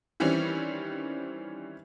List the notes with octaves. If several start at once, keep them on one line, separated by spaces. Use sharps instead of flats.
D#3 E3 G3 C4 C#4